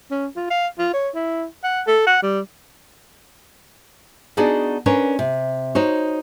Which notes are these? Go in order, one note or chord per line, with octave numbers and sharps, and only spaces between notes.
C#4
F4
F5
F4
C#5
E4
F#5
A4
F#5
G3
B3 D4 D#4 F#4 G#4 D5
C#4 D4 A#4 B4 C#5
C3
D#4 F#4 C5 C#5